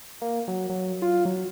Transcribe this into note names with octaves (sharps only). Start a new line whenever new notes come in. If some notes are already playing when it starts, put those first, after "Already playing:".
A#3
F#3
F#3
F4
F#3